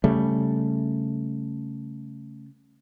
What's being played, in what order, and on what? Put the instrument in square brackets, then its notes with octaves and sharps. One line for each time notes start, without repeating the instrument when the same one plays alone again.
[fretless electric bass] C#3 G3 [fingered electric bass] A3